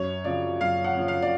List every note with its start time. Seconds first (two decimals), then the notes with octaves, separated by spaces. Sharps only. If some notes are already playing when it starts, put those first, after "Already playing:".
Already playing: F#2 C#5
0.24 C#3 F3 D5
0.61 F#2 F5
0.84 F#5
0.97 C#3 F3
1.08 F5
1.22 D5